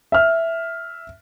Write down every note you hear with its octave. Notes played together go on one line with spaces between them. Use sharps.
E5 F6